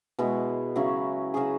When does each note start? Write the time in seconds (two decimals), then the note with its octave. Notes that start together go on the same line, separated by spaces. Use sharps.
0.19 B2 G#3 B3 E4
0.76 C#3 F#3 C#4 E4
1.34 C#3 F#3 C#4 G#4